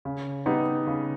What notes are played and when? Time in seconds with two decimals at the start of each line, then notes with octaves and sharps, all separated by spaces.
0.05 C#3
0.46 G3 B3 D#4
0.87 C#3